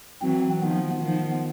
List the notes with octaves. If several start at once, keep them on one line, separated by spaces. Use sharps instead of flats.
E3 F#3 C4
D#3 F3 B3
D#3 F3 B3